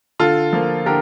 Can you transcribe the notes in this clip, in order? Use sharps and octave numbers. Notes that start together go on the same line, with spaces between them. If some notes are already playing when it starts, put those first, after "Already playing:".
D3 F4 A4
F3 A#3
D3 G4 A#4